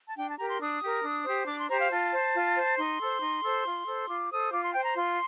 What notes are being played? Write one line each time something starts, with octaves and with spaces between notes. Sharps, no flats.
A5
D4 G5
A5
G4 A#4 A#5
C6
D4 D#6
G4 A#4
D4
G4 C5
D4 D6
C6
G4 C5 A#5
F5
F4 A5
C5
F4
C5
D#4 C6
A4 C5
D#4
A4 C5
F4
A4 C5
F4 D6
A4 C5 D#6
F4 D6
C6
C5 G5
A#5
F4 C6